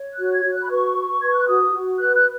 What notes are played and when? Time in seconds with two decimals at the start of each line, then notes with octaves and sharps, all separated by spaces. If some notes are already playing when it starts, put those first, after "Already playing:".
Already playing: C#5
0.13 F#6
0.18 F#4
0.32 G#6
0.44 F#4
0.52 F#6
0.62 B5
0.70 B4 C#6
0.96 B4
1.20 B4 G#6
1.33 F#6
1.48 F#4 D#6
1.73 F#4
1.99 B4 F#6
2.16 F#6